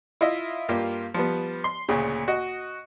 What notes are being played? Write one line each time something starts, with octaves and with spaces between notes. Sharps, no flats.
E4 F4 D#5 E5
G2 A#3 F4 G4
F3 G3 B3
C6
D2 A#2 C#3
F#4 D#5